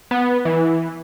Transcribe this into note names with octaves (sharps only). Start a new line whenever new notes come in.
B3
E3